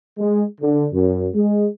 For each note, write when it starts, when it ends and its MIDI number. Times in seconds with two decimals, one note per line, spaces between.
0.18 0.44 56
0.61 0.88 50
0.93 1.29 42
1.33 1.66 56